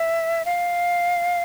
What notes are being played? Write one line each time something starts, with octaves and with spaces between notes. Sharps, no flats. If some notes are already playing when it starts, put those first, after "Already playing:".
Already playing: E5
F5